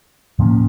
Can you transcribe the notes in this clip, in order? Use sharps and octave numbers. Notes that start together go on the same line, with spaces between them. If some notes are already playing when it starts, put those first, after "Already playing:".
A2 F3 A#3 C#4